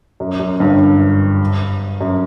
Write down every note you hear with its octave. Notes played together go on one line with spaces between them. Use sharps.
F#2
F#2
G1 G2
F#2